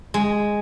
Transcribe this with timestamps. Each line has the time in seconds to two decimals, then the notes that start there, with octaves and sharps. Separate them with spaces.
0.14 G#3